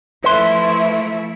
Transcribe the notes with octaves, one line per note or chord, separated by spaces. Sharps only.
F3 A3 E4 B4 C6